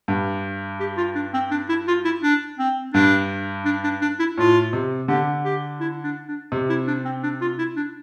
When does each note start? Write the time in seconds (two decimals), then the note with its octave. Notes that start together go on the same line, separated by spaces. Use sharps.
0.08 G2
0.80 G4
0.97 F4
1.15 D4
1.34 C4
1.51 D4
1.69 E4
1.87 F4
2.05 E4
2.23 D4
2.59 C4
2.94 G2 D4
3.65 D4
3.84 D4
4.02 D4
4.19 E4
4.37 A2 F4
4.73 C3
5.08 D3 G4
5.45 G4
5.80 E4
6.04 D4
6.28 D4
6.52 C3
6.69 E4
6.87 D4
7.05 C4
7.23 D4
7.41 F4
7.59 E4
7.76 D4